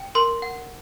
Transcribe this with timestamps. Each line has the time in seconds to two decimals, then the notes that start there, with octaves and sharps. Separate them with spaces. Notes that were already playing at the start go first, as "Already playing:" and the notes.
Already playing: G5
0.15 A#4 C6
0.42 F#5